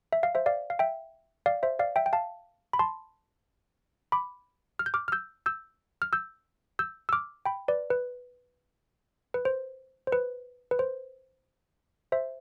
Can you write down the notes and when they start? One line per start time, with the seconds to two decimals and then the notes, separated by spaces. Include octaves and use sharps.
0.13 E5
0.23 F5
0.35 C5 E5
0.46 D5 F5
0.70 F5
0.79 E5 G5
1.46 D5 F5
1.63 C5 E5
1.79 D5 F5
1.96 E5 G5
2.06 G5
2.13 F5 A5
2.73 B5
2.79 A5 C6
4.12 B5 D6
4.79 F6
4.86 G6
4.94 D6 F6
5.08 F6
5.12 E6 G6
5.46 E6 G6
6.02 F6
6.13 E6 G6
6.79 E6 G6
7.09 E6
7.13 D6 F6
7.46 G5 B5
7.68 B4 D5
7.90 B4
9.34 B4
9.45 C5
10.07 C5
10.12 B4
10.71 B4
10.79 C5
12.12 C5 E5